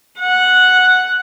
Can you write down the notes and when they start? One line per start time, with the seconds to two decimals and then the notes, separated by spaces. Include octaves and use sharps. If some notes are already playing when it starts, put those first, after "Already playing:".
0.19 F#5